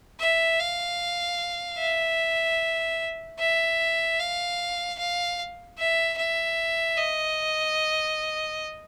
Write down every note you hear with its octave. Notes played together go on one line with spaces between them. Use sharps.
E5
F5
E5
E5
F5
F5
E5
E5
D#5